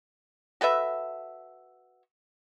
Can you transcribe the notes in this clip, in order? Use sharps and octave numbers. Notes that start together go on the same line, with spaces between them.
F#4 A4 B4 E5